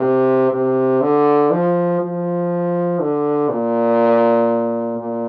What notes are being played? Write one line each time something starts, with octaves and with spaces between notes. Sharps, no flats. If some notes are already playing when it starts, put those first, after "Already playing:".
Already playing: C3
C3
D3
F3
F3
D3
A#2
A#2